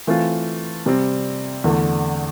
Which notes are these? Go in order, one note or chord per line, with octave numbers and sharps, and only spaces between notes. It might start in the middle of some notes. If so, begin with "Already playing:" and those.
E3 A3 C4 F4
C3 G3 C4
E2 D3 A3